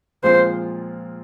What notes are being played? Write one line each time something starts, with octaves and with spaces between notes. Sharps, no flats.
A#2 F3 G#3 C4 F4 C5